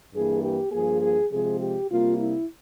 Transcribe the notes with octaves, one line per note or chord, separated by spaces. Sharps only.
G2 E3 A#3 G#4
G4
G2 F3 A#3 G#4
G#4
C3 F3 G#3 G#4
G4
C3 G3 A#3 F4
E4